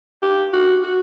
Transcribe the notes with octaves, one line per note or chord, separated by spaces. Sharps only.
G4
F#4
F#4